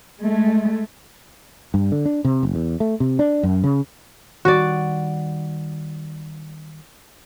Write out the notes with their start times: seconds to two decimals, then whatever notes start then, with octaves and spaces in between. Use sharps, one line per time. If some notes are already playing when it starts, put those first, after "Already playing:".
0.21 G#3 A3
1.74 G2
1.92 D3
2.05 D4
2.25 C3
2.43 F#1
2.55 E2
2.80 A3
3.00 C3
3.19 D4
3.43 F#2
3.64 C#3
4.45 D#3 G3 F#4 D5